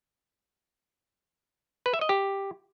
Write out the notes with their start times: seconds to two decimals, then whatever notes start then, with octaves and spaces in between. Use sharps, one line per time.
1.86 B4
1.94 E5
2.01 D#5
2.09 G4